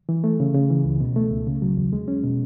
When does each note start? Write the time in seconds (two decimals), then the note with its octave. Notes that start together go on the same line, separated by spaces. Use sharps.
0.09 E3
0.24 A3
0.40 C#3
0.55 C#3
0.70 E3
0.85 C#2
1.00 B2
1.16 A3
1.32 C#2
1.47 C#3
1.62 F#3
1.77 E2
1.93 G#3
2.08 C#4
2.24 B2